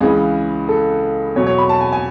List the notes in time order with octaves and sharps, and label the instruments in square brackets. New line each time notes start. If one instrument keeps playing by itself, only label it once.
[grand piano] C#2 C#3 E3 G#4
A4
E2 B2 F#3 C#5
C#5
B5
A5
G#5
G#5